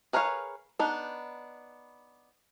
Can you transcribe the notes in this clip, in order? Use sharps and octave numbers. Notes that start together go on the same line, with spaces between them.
G#4 A#4 B4 C#5 F5
B3 D4 D#4